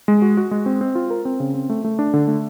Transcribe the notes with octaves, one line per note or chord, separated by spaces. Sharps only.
G#3
F#4
F#4
G#3
C4
C4
F4
A#4
C4
C#3
C4
A3
A3
D4
D3
A3